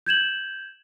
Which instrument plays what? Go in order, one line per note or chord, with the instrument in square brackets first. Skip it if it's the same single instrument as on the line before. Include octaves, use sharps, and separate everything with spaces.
[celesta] G6 G#6 E7 F#7